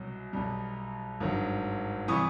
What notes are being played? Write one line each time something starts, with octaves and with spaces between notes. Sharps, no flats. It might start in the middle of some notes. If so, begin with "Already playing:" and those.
Already playing: C2 B2 F#3
B1 B2 G3
G#1 G2 D#3 F#3
C3 E3 G3 C#6 D#6